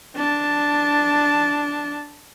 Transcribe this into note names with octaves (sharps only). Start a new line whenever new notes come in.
D4 A5